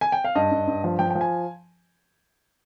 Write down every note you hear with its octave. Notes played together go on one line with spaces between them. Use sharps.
G#5
G5
F5
G2 D#5
G2
G2
F3
F3 G5
G5
F3
G#5